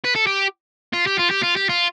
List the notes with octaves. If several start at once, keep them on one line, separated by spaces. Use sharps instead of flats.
B4
A4
G4
F4
G4
F4
G4
F4
G4
F4